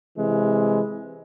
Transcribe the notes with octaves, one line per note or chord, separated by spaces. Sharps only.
C3 E3 G#3